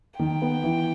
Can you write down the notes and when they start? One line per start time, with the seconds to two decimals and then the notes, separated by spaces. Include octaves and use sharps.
0.19 D#3 G5
0.42 B3
0.64 E3